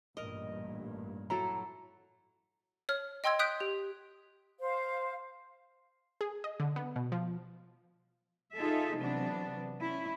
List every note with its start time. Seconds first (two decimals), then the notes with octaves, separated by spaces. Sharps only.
0.17 A1 G2 A#2 A#4 D#5
1.30 F#3 E4 A4 A#5
2.89 C#5 F6
3.24 D#5 G5 C6 E6 G#6
3.39 D#6 F#6 G6 B6 D7
3.60 G4
4.59 C5 F5
6.21 G#4
6.44 D#5
6.60 D3
6.76 B3
6.96 B2
7.12 F3
8.55 D#4 F4 G#4 A4 E5
8.98 C3 E3 F#3 B3 D4
9.80 C#4 E4